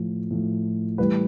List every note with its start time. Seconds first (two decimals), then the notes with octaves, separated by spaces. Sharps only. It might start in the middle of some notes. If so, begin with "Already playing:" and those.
Already playing: A2 F3
0.31 A2 F3
0.98 A2 E3 G3 B4